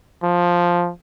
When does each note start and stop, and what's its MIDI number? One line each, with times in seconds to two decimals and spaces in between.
0.23 0.92 53